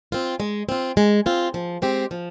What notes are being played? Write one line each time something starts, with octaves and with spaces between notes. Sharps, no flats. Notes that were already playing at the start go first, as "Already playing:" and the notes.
C4 F4
G#3
C4 F4
G#3
C4 F4
F3
G#3 C4 G4
F3